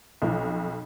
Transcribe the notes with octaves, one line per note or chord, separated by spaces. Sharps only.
B1 F2